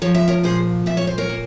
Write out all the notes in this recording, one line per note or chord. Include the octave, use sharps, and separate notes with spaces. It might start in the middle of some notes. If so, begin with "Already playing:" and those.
F3 C#5
E5
A#4 C#5
A#2 G#4 C5
A#2 E5
C#5
C5
A#4 C#5
A#3